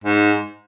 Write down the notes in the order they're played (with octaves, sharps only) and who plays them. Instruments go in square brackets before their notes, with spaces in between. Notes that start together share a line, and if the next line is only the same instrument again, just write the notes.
[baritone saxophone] G#2